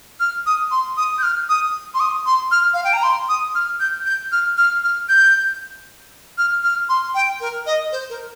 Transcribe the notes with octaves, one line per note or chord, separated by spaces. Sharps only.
F6
D#6
C6
D#6
G6
F6
D#6
C6
D#6
C6
F6
F5
G5
A#5
C6
D#6
F6
G6
G6
F6
F6
F6
G6
F6
F6
C6
G5
A#4
D#5
C5
A#4